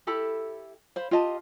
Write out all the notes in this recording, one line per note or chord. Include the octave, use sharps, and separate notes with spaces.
E4 G4 A4 B5
C5 F5 B5
F4 G4 D#5 A5